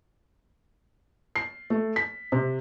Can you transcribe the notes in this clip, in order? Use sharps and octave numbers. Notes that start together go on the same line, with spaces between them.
C7
A3
B6
C3